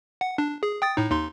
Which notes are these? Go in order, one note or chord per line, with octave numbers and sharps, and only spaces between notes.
F#5
D4
G#4
G5 D#6 A6
A2 D#4
D#2 D#4 C6